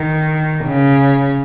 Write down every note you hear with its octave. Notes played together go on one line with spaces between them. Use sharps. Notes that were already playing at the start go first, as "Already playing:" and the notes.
Already playing: D#3
C#3